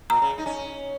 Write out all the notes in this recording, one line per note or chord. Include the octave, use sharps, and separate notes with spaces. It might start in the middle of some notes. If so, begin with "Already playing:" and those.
A#2 A#5
C#3
D#4
C#4